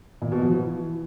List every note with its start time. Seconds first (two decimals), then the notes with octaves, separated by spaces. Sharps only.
0.22 A#2
0.32 B2
0.42 F3
0.52 E3